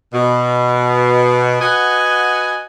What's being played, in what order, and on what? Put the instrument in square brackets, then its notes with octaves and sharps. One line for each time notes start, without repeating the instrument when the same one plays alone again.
[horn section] B2
F#4 B4 D#5 F#5 G#5